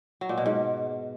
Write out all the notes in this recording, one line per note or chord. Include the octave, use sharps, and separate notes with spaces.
F#3
A#2
B2
G#2